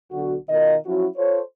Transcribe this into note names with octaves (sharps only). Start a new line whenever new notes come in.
B1 D3 F#4
B2 D#3 F4 A#4 D#5
F3 F#3 C#4 E4 F#4
F4 A4 C5 C#5